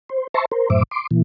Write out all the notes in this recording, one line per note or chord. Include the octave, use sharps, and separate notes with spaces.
C5
C5 E5 A5 A#5 C6 C#6
A#4 C5
F#2 A2 C5 E5 D6
C6 D6
A#2 E3